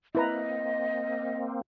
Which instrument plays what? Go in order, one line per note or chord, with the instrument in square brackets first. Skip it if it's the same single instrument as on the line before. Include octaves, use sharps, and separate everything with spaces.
[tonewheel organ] A#3 C4 [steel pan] E4 B4 A#5 [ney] D#5